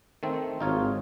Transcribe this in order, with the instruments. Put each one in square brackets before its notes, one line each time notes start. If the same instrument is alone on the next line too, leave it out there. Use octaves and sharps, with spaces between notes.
[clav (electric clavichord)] D#3 A3 C4
[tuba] G#1 [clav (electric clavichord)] D#4 F4 C#5